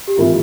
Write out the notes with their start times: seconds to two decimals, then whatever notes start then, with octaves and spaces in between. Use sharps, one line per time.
0.08 G4
0.17 G#1 E3 A#3 E4 F4